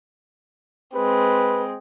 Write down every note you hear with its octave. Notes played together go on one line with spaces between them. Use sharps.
G#3 C4 B4